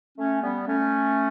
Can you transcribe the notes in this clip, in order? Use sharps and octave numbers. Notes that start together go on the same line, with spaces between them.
A3 C#4
G3 B3
A3 C#4